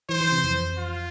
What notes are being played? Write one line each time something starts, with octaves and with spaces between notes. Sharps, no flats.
E3 C5
E3
C3
F2
F4